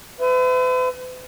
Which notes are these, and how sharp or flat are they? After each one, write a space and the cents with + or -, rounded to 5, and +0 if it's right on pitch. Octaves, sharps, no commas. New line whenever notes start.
B4 +45 E5 +15